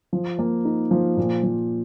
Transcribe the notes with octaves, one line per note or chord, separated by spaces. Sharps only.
F3
A#3
D#4
F3
A#2
F3